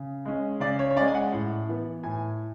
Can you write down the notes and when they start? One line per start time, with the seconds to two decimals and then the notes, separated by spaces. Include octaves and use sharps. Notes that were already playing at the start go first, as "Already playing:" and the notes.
Already playing: C#3
0.25 G#3 C#4
0.60 C#3 D5
0.79 C#5
0.91 C#5
0.96 C#4 D5
1.00 G#3
1.08 G#5
1.15 F#5
1.32 A2
1.68 E3 B3
2.04 A2 G#5